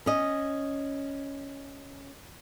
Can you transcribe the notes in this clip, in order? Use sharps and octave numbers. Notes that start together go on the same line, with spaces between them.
C#4 D#5